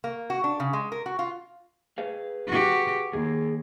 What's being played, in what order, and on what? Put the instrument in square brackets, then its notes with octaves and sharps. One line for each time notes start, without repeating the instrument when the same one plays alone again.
[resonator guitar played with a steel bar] A#3
F#4
D4
C#3
G#3
A#4
F#4
F4
[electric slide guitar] G#4 B4 F5
[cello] F#4 G4
[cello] D#2 [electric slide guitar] G#4